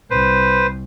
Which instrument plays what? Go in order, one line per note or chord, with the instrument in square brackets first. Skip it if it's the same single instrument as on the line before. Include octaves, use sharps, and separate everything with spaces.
[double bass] C2 [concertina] B4 C5